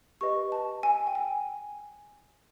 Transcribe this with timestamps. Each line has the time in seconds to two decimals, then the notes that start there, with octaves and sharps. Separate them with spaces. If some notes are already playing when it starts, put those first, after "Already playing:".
0.21 G4 B4 D#5 C#6
0.52 A5
0.83 G#5
1.07 G5
1.15 G#5